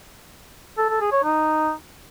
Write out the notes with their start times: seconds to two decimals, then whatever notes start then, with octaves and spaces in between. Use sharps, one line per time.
0.78 A4
0.89 A4
1.01 G#4
1.12 C#5
1.24 D#4